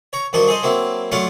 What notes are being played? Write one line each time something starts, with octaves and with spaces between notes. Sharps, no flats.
C#5 A#5
G2 D#3 F3 D4 F#4 A5
G#4 A4 C5 D#5
F#3 A#3 C4 E4
F#3 A3 D4 F4 F5 F#5